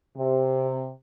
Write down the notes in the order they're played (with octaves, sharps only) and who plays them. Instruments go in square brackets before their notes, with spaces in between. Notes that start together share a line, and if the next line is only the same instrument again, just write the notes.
[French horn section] C3